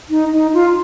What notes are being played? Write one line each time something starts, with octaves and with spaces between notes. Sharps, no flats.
D#4
D#4
F4